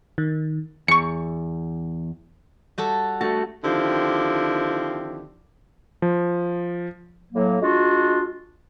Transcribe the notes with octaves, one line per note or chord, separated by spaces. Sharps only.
D#3
E2 C#6 C#7
G3 F#4 A4
A3 F#4 A5
D3 D#3 F3 C4 E4 G4
F3
A2 F#3 A#3
G#3 D4 F4 F#4